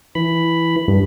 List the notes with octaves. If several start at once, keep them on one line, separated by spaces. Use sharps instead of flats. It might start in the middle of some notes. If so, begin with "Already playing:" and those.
E3 B5
G2